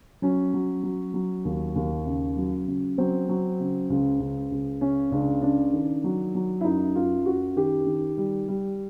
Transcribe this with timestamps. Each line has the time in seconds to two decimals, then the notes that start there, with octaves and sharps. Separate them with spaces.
0.22 F#3 C#4
0.54 F#3
0.83 F#3
1.14 F#3
1.45 D#2
1.75 D#2
2.06 C#3
2.37 F#3
2.67 C#3
2.98 F#3 C4
3.29 F#3
3.60 C#3
3.90 C#2
4.20 C#2
4.51 C#2
4.81 C#3 C#4
5.11 C#2 D4
5.42 C#3 D4
5.73 D#3
6.04 F#3
6.35 F#3
6.61 E4
6.64 F#2 D#4
6.95 F#2 F4
7.25 F#2 F#4
7.56 D#3 G4
7.86 D#3
8.17 G3
8.48 G3